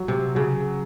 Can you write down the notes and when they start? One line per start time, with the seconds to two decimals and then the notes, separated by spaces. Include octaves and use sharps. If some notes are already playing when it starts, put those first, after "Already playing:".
Already playing: F#3
0.08 C3
0.35 C#3 F#3